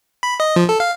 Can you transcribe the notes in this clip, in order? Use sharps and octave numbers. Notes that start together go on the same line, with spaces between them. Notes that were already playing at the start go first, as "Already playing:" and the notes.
B5
D#5
F3
A4
F5